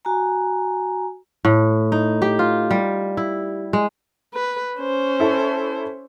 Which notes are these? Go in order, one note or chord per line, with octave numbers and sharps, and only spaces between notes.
F#4 G#5 A#5
A2
D#4
G4
F4
G3
E4
G#3
B4
C#4 C5
E4 A4